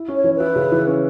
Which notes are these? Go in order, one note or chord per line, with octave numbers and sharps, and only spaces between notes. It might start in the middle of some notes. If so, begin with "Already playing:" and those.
Already playing: E4
C#4
C#5
E3
E4 B4
C#3
E3
C#4